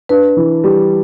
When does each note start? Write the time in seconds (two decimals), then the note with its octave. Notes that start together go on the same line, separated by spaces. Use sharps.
0.09 D4 B4
0.37 E3
0.64 G3